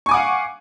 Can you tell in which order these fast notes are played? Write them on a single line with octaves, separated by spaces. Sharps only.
C#6 G#5 D6 F#5 F5